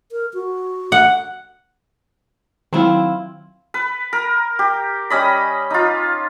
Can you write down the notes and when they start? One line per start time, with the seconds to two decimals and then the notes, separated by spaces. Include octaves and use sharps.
0.12 A#4
0.34 F#4
0.92 F#5
2.73 D#3 F#3 C4 E4 F4
3.74 B4
4.13 A#4
4.59 G4
5.10 G3 C#4 D#5 B5
5.70 D#4 F4